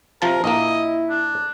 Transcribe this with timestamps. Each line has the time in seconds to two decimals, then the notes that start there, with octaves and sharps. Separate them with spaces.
0.22 C3 F3 A#4 A5
0.44 A#1 A#3 E4 D#5
1.10 D4